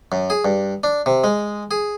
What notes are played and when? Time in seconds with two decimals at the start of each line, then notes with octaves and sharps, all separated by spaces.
0.12 F#2
0.30 G#4
0.45 G2
0.84 D4
1.06 C3
1.24 G#3
1.71 G#4